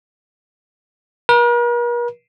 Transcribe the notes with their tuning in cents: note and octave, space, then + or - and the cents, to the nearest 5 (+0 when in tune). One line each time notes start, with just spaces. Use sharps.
A#4 +45